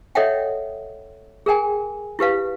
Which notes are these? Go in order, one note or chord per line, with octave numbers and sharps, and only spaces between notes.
A4 C#5 D#5 E5 F#5 G5
G#4 A#4 G5 G#5
E4 G4 B4 F5